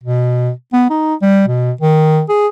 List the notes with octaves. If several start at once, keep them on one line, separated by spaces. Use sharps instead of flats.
B2
B3
D#4
G3
B2
D#3
G#4